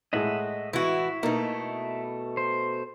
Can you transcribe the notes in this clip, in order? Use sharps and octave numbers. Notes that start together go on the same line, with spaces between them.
A2 G#3 D#5 E5 F#5
E3 E4 F#4
B2 A3 A#3 D#4
C5